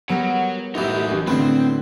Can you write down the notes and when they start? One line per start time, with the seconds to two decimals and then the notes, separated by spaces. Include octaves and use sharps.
0.09 F#3 G3 B3 A#4 C#5 F#5
0.75 A1 F#2 E3 D#4 G4
1.11 A1
1.27 A2 D3 B3 C4